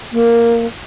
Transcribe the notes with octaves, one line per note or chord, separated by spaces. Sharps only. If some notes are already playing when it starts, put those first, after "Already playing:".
A#3